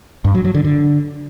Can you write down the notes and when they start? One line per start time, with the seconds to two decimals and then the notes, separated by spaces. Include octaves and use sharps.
0.25 G2
0.35 F#3
0.45 F#3
0.55 D3
0.65 D3